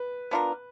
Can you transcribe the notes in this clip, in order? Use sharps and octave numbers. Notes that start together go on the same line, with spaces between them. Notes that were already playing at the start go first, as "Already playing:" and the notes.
Already playing: B4
B3 D4 F4 A#4